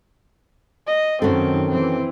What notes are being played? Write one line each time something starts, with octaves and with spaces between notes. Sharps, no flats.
D#5
F#2 D#3 C4 C#4 F#4 A4
E3 C4